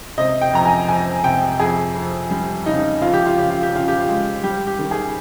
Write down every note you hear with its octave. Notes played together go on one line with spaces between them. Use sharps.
C3 D#5
G5
F2 A#5
G#5
F2 G#5
C3 G5
F2 G#4
F2
G3
C#3 D#4
F2 F4
G4
F4
C#3 G4
F4
G4
C#3 F4
G4
F4
G#3
G3 G4
G4
D#3
G#4